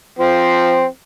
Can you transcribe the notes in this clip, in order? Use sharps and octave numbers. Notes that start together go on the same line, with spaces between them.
F3 C4